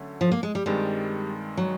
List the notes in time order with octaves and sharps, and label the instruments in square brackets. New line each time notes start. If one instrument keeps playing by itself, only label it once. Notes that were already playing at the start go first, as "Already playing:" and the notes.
Already playing: [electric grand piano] D3 F#3 A3 C#4
[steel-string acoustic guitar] F3
A#3
G#3
G3
[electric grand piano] G2 D#3 G#3 C4 [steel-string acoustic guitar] G3
[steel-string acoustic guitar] F#3